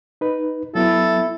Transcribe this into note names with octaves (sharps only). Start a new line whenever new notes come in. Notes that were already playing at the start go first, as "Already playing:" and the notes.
D#4 B4
F#3 B3 E4 A4